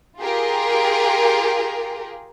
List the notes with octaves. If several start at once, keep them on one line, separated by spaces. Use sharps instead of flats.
F4 G4 G#4 A#4